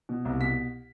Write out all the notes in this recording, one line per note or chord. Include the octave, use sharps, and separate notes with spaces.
B2
C2
B2 B6